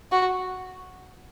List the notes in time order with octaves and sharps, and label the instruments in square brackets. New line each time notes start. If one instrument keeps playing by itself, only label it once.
[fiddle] F#4